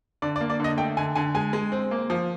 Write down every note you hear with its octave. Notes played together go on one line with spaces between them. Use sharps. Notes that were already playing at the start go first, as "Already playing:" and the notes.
D3 D5
D5
A#3
D5
D3 D#5
A3 G5
D3 G#5
D3 G#5
G#3 G#5
G#3
C4
A#3
F3